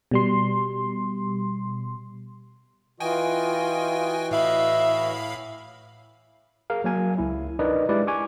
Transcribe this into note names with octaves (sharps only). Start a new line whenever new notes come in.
B2 G3 C6
E3 F4 F#4 D#5 G5 G#5
A2 E5 F5 B5
G#4 A#4 F5
F#3 A#3 G#5
C#2 E4
D4 D#4 A#4 B4 D5 D#5
G#3 E4 G4 B4 D5
G#5 C#6 D6